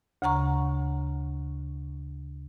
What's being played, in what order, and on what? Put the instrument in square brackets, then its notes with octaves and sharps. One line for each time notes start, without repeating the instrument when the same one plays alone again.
[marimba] D2 C#3 F#5 A#5 C#6